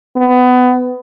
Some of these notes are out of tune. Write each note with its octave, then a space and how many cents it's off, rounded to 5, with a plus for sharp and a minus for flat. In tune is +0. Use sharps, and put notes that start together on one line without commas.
B3 +20